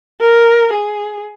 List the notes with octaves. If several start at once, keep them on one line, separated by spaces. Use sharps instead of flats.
A#4
G#4